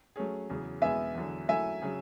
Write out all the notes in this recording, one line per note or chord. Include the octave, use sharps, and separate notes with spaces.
F#3 A3 C#4 G#4
E2 C#3 F#3
E2 B2 G#3 B3 E5 G#5
E2 D3 F#3
F#3 A3 E4 A4 E5 G#5
C#3 F#3 C#4 G#4